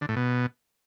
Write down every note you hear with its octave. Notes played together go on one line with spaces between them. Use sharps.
D3
A2
B2